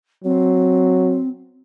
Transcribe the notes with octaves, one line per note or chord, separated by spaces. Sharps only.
F#3 C4